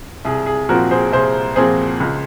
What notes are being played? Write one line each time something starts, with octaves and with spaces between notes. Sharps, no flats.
C2 G#4
G#4
A#2 F3 C4 F#4 A#4
G#4 C5
C2 G#4 C5
A#2 F3 C4 G#4 C5
C#2